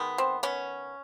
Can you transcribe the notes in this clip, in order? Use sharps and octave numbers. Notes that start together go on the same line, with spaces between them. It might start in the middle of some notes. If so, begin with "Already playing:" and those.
Already playing: D#3 G#3 B3
C4
B3 C#4